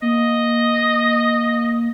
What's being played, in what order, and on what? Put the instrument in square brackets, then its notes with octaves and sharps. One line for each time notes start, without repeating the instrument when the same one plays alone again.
[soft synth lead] A#3 [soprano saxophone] D#5